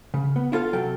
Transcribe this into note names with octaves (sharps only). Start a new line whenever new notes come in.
C#3
B3
E4 F4 A4 F5
C3 F#3 A4 G5